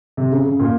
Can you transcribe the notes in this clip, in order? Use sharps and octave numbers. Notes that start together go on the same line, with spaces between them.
C3
C#3
C#3
A#2